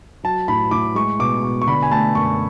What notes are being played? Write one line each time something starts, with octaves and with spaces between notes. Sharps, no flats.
F#3 A5
A2 B5
A2 D6
G#3 C#6
B2 D6
B2 C#6
C#6
D3 B5
G#5
A3 A5
F#2 C#6